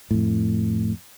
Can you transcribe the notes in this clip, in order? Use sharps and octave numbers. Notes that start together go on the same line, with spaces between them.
F2 A2